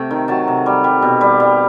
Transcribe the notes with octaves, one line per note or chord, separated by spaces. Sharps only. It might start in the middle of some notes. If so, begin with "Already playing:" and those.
Already playing: C3 A3 G5
D#3
F#3 A5
C3
G3
G3
B2
G3
G3